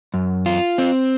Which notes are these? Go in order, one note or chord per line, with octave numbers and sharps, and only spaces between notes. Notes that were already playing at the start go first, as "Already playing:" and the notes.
F#2
F4
C4